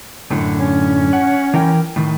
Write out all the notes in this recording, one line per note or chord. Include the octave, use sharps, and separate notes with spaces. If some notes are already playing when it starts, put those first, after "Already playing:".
F#2 A2 D3
C#4
F#5
E3 A#4 G5
A2 D#3